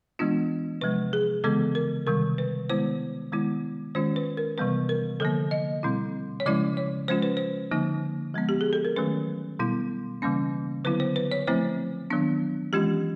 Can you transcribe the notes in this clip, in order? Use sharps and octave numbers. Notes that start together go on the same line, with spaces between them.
E3 G#3 B3 D4 F4
C3 F3 G#3 B4
G#4
C#3 E3 G#3 B3 A4
A#4
C3 D#3 G3 A#4
B4
D#3 G#3 B3 E4 C5
D#3 G#3 B3 E4
D#3 G#3 C#4 F4 C5
B4
A#4
C3 E3 G3 B3 B4
A#4
D3 F3 A#3 A4
D#5
B2 G3 C4 E4
C#5
C#3 F3 G#3 C#4 E4 D5
C#5
F3 G#3 C#4 F4 C5
B4
C5
D3 F3 A#3 D#4
F3 G#3 B3
G4
G#4
A4
A#4
D#3 F#3 A3 C#4 B4
B2 G3 B3 E4
C#3 E3 G3 A#3 C#4
D3 F#3 B3 E4 B4
C5
B4
C#5
F3 A3 C4 E4 C5
D#3 F#3 B3 D4
E3 G#3 C#4 F4 G4